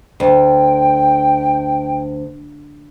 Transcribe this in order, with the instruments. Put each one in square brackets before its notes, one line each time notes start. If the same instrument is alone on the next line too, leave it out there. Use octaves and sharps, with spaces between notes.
[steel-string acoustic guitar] D2 [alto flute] G5